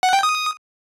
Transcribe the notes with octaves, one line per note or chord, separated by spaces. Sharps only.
F#5
G5
D#6